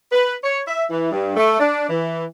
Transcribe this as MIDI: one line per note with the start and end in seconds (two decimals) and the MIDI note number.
0.11 0.34 71
0.43 0.60 73
0.67 0.84 76
0.90 1.09 52
1.12 1.36 43
1.36 1.57 57
1.59 1.85 62
1.89 2.24 52